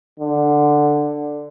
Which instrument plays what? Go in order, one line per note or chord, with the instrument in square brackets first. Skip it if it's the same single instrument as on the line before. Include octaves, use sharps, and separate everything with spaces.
[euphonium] D3